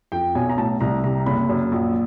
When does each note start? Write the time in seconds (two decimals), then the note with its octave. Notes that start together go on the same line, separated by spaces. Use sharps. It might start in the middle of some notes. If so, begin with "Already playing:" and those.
0.12 F2 G5
0.35 B1 G#5
0.49 A#5
0.57 A2 A5
0.81 C2 A#5
1.04 C3 A#5
1.26 F#1 B5
1.49 F#2
1.72 A#1